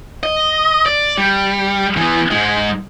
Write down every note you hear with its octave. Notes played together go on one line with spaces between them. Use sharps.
D#5
D5
G3
E3 B3
G#2 G#3